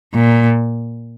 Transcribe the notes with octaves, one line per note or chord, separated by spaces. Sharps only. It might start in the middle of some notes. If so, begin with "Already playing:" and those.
A#2